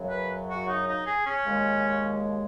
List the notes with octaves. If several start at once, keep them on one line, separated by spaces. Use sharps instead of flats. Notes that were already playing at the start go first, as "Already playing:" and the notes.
Already playing: F#2 C#3 F#3
B4
F#4
D#4
D#4
G#4
C#4
D#2 C#3 G#3